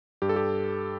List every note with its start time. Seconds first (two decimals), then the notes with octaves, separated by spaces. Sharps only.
0.22 G2 G4
0.29 A4
0.36 G4